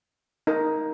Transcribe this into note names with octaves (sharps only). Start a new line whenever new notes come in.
D#4 A#4